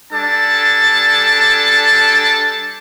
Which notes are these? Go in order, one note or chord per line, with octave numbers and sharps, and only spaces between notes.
G3 D4 A4 G#5 A5